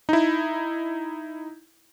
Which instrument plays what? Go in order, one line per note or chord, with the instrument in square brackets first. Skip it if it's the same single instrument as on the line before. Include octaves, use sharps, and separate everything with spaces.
[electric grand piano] D#4 E4